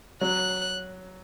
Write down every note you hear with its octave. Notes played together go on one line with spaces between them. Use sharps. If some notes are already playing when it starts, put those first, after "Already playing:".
F#3 F#6